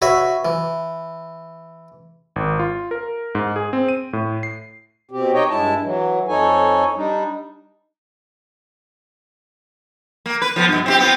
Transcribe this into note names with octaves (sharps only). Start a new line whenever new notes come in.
F#4 B4 C#5 E5
E3
G#1
F4
A#4
G#2
G#4
C4
D#7
A2
C7
B2 C4 G4
D#4 G4 C#5 D#5 G5
G2 G#3 E4 A5
E3 F#3
F2 D#4 A4 C#5 G#5
G3 D4 D#4
A#3
B4
F3 A#3 B3
G2 B2
C4 E4 G4
B3 C4 F4